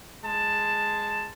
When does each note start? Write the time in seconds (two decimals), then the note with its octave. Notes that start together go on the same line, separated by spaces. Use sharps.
0.24 G#3 A5